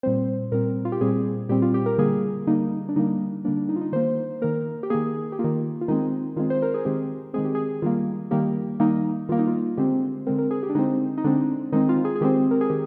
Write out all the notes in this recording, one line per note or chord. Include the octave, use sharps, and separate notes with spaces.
A#2 G3 C4 C5
A#2 G3 C4 A#4
F4
G4
A#2 G3 C4 G#4
A#2 G3 C4 G4
F4
G4
A#4
D3 G3 A#3 G#4
D3 G3 A#3 D#4
D4
D3 G3 A#3 D#4
D3 G3 A#3 D4
D4
D#4
F4
D#4
D#3 A#3 C5
D#3 A#3 A#4
G4
D#3 A#3 G#4
G4
A#3 F4
D#3
F4
D#3 G#3 C4 D#4
D#3 G#3 C4 F4
C5
A#4
G#4
D#3 G#3 C4 G4
D#3 G#3 C4 G#4
G4
G#4
D#3 G3 A#3 F4
D#3 G3 A#3 G4
D#3 G3 A#3 D#4
D#3 G3 A#3 F4
D#4
F4
D3 G#3 C4 G4
D3 G#3 C4 A#4
A#4
G#4
G4
D4
D3 G#3 C4 D#4
D#4
D3 G#3 C4 D4
D#3 G#3 C4 D#4
F4
G#4
G#4
D#3 G#3 C4 G4
A#4
G#4
D#3 G4